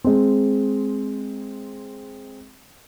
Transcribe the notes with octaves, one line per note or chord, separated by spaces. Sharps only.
G#3 C4